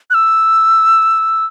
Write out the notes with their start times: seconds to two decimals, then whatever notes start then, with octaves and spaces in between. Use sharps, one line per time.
0.10 F#6
0.14 E6